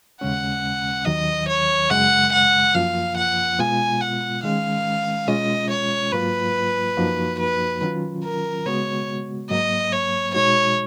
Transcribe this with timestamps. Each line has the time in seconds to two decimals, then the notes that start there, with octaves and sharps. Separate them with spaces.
0.21 D#2 C#3 G#3 C#4 F#5
1.06 D#2 D#3 F#3 D#5
1.48 C#5
1.90 F#2 C#3 G#3 F#5
2.33 F#5
2.75 F#2 F3 A#3 F4 F5
3.17 F#5
3.59 B2 G#3 B3 F4 G#5
4.01 F#5
4.43 D#3 G#3 C#4 F5
5.28 B2 G#3 C#4 F4 D#5
5.70 C#5
6.12 G#2 F#3 A#3 F4 B4
6.97 F#2 F3 A#3 D#4 F#4
7.39 B4
7.81 D#3 F#3 C#4 F4
8.24 A#4
8.65 C#3 G#3 B3 F#4 C#5
9.50 G#2 F#3 A#3 D#5
9.92 C#5
10.34 B2 G#3 D#4 F#4 C#5